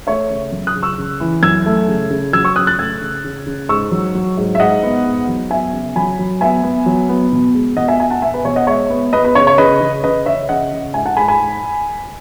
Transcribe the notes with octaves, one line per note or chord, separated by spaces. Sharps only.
A3 C#5 E5
C#3
F#2
D#6 F#6
C#3
C#6 E6
C#3
E3
F#2 E6 G#6
A3
C#3
C#3
F#3 E6 G#6
C#6 E6
C#3 D#6 F#6
F#6 A6
A3 E6 G#6
C#3
C#3
C#3
G#2 C#6 E6
F#3
F#3
G#2
E5
G#2 D#5 F#5
B3
G#2
F#3
B3 E5 G#5
C#3
F#3 G#5 B5
F#3
B3 E5 G#5
B3
F#3
B3
B2
G#3
B2 D#5 F#5
E5 G#5
B3 E5 G#5
F#5 A5
B3 E5 G#5
B4
B2 C#5
D#5 F#5
G#3 C#5 E5
B3
B3 B4 D#5
B4
C#3 C#5
C#5
C#3 B4 D#5
C#3
C#3 B4 D#5
C#3 C#5 E5
C#3 D#5 F#5
C#3
G#2 E5 G#5
F#5 A5
G#2 G#5 B5
G#5 B5
G#2